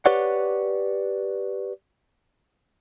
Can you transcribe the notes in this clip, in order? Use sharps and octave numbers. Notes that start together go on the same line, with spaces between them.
G4 B4 C#5 D5 F#5